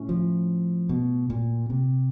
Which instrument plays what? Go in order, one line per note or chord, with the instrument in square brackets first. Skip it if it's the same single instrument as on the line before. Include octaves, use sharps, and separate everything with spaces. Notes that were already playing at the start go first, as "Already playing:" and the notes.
Already playing: [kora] A2 C#4
[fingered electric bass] F3
B2
A#2
C3